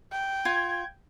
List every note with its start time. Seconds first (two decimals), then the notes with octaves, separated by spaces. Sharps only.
0.12 G5
0.45 F4 G#6